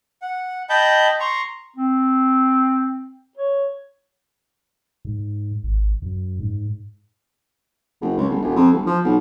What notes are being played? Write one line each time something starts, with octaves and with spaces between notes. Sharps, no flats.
F#5
D#5 G5 A5 B5 G6
A#5 C6 C#6
C4
C#5
G#2
G#1
F#2
G#2
F#1
C#2
G1
E1
F2
G1
F3
B1